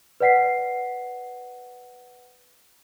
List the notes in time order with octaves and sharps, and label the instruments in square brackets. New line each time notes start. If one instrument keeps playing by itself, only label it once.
[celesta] B4 D5 F#5 B6 C7